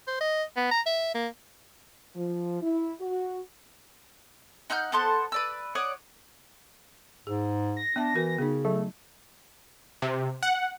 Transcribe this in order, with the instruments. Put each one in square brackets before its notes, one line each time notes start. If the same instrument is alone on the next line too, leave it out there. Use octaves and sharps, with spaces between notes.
[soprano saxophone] C5
D#5
B3
A#5
E5
A#3
[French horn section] F3
E4
F#4
[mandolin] D#4 F#5 F6 G6
B3 A4 C5 F#5
B4 D5 E6
C#5 D5 F#5 D#6
[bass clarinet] G#2 [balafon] G#4
[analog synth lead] A#6
[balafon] B3 E5 A5 [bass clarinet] D4
[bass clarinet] E3 [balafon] F#4 A#4
[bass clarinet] C#3 [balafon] B3 D#4
[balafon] F#3 [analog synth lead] A3
[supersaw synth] C3
F#5